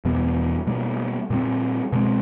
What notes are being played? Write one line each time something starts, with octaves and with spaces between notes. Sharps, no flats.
E2 B2 G3 B3
B2 G3 A#3
A#2 G3 C4
B2 G#3 C4